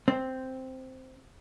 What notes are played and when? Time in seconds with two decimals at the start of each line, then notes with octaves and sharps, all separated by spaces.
0.08 C4